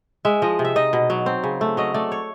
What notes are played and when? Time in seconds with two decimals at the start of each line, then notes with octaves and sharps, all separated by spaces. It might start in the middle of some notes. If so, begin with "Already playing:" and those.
0.25 G#3 E5
0.42 F3 D#5
0.59 C3
0.65 E5
0.76 D#4 D#5
0.93 B2
1.10 F#3
1.26 C4
1.44 C#3
1.61 A3
1.77 F#3 D#5
1.94 A3 D5
2.12 C#5